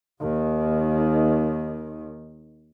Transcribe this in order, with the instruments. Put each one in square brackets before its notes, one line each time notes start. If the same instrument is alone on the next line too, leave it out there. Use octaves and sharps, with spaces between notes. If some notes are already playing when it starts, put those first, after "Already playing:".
[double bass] D#2 D#3